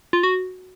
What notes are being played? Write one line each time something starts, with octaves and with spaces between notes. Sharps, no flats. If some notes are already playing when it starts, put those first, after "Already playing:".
F4
F#4